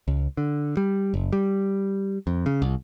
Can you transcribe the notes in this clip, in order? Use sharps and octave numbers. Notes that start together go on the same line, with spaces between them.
C#2
D3
G3
F#1
G3
F2
C#3
C2